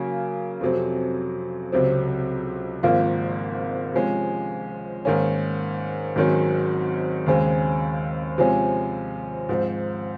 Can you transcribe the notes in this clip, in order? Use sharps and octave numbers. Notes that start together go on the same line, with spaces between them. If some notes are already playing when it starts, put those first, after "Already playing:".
Already playing: C#3 F#3 A#3
F2 C3 F#3
C#2 C3 F#3 C4
G#1 G#2 F3 A#3 F4
C3 F3 G#3 C#4
G#2 D#3 A#3 C#4
G#1 G#2 D#3 F#3 C#4
D#2 C#3 G#3 C4
C3 F3 G#3 C#4
G#2 F3 C4